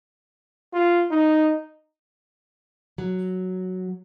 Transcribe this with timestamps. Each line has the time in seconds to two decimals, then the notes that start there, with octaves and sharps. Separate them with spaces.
0.73 F4
1.11 D#4
2.98 F#3